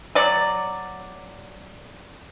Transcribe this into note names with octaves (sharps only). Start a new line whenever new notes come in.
F#3 D5